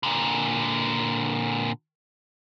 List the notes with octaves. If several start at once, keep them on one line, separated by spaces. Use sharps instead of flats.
A#2 D3